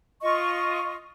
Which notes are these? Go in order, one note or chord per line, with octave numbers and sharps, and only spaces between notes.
F4 D#5 C#6